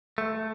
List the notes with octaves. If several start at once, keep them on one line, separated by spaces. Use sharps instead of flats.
A3